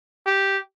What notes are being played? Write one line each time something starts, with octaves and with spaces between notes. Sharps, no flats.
G4